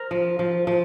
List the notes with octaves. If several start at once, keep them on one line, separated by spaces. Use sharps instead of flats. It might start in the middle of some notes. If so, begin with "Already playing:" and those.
Already playing: A#4 C5
F3
F3
F3